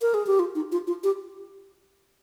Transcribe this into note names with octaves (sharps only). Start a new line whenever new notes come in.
A#4
G#4
G4
F4
D#4
F4
F4
G4